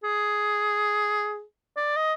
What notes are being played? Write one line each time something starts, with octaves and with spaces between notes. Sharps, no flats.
G#4
D5
D#5